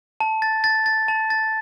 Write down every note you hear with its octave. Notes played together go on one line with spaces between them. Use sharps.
A5
A6
A6
A6
A5
A6